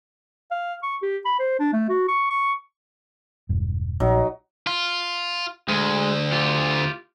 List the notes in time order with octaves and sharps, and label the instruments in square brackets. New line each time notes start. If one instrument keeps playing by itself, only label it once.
[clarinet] F5
C#6
G4
B5
C5
D4
A3
F#4
C#6
C#6
[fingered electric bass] E1 G2
[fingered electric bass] A#1 [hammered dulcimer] F#3 D#4
[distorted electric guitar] F4
[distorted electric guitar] D2 [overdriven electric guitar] G#3
[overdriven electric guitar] F4 G4